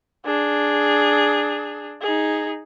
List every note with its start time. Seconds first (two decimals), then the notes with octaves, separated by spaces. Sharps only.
0.26 D4 G#4
2.02 D#4 G#4